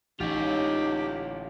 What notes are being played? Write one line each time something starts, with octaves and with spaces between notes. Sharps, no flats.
A1 D#4 F4 G4 C#5